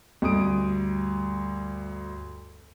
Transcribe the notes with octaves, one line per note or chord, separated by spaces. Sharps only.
D2 G2 D#6 D7